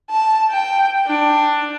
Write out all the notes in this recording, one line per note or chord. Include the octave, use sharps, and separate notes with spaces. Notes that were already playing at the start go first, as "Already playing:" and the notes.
A5
G5
D4